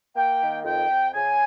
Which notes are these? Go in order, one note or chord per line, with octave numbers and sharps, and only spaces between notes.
A#3 G5
D#3
F2 G5
F2
C#3 G#5